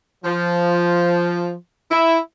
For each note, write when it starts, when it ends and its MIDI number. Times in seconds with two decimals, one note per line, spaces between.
0.25 1.54 53
1.91 2.19 64